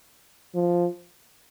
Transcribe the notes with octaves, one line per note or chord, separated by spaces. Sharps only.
F3